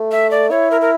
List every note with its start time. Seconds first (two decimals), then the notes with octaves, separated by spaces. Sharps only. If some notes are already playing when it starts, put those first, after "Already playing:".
Already playing: A3
0.11 E5
0.31 D5
0.51 E4 C#5
0.71 A#4
0.81 A#4